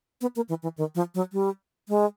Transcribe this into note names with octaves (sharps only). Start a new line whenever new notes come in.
B3
A#3
E3
E3
D#3
F3
F#3
G3
G#3